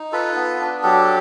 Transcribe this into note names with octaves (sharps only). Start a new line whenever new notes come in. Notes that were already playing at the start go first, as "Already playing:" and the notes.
Already playing: D#4
F4 A4 B4
B3
D4
F#3 G4 A4